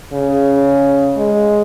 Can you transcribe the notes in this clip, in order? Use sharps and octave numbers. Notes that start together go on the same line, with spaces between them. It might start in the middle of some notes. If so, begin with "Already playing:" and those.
C#3
G#3